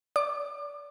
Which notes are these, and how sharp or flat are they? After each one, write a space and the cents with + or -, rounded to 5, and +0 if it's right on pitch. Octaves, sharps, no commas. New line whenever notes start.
D5 -25 D6 +35